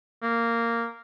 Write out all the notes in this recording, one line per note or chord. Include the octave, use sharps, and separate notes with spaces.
A#3